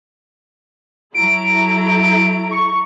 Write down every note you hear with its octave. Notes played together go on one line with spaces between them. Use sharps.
F#3 E4 A4 A#5 D7
C#6